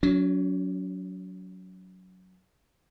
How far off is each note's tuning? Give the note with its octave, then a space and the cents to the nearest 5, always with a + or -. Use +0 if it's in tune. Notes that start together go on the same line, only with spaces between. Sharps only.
F#3 +0 C#4 +40